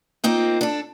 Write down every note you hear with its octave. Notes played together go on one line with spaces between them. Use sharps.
A#3 C4 D#4 F4
D4 A4